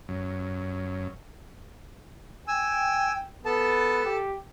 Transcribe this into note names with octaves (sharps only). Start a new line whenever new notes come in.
F#2
G5 G#5 E6
B3 A4 A5
G4